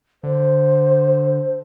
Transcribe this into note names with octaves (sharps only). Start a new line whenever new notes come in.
D3 C5